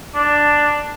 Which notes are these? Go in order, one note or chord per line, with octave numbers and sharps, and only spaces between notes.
D4